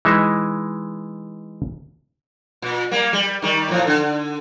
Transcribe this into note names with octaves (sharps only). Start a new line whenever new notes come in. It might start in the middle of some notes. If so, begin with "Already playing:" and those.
E3 G#3 D#4 E5
A#2
G3 A#3
G3
D#3 G3
A2 F3
D3